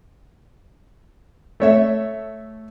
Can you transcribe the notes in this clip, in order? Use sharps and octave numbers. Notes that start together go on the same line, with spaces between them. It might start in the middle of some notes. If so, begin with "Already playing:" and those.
A3 C#5 E5